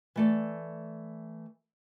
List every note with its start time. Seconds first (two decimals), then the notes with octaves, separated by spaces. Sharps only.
0.16 E3 A3 D5